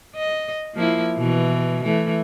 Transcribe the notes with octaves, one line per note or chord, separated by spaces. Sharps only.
D#5
F3 A#3 E4
B2 E3
E3 A3